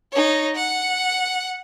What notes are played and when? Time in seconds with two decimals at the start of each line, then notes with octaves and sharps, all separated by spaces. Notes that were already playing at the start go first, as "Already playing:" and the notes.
0.12 D#4 C#5
0.55 F#5